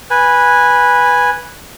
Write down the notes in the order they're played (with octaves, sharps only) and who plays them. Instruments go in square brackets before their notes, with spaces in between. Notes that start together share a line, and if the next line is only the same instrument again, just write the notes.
[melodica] B4 G#5